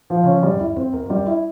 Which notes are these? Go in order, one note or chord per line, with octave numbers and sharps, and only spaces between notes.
F3
C#3 C#4
E3
C#3 F3 G3
G#2
E2 G2 E4
F2 C4
E2 A#4
F2
G3
F2
E4